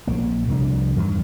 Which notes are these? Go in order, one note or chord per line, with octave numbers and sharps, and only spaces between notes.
A#1 A#3
C2 F2 C4 D4
E2 G2 D#3 F3